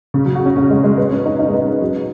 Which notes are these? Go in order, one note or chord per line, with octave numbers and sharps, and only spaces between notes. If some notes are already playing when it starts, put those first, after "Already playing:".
C#3
F#3
F#4
C#4
C#4
G#3
G#3
B3
C#4
D#4
D#4
G#3
B3
F#3